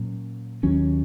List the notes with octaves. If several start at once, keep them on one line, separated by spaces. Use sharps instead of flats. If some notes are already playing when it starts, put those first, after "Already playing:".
Already playing: A#2 F#3 C#4
D#2 D#3 F#3 C#4